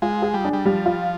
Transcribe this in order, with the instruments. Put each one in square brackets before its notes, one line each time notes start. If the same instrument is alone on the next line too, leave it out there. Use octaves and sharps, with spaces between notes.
[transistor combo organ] G#3 [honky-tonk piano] F4
[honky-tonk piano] G#4
[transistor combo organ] G3
[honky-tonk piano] D4
[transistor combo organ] G3
[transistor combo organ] F3 [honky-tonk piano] G3
[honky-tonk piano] F4